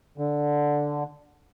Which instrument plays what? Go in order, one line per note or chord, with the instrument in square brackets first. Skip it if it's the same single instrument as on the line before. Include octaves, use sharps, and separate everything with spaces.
[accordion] D3